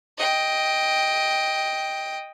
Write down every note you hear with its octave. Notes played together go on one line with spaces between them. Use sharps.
D#5 G5